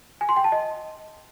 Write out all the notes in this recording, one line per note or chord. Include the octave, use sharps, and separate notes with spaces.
G#5
C6
G5
A5
D#5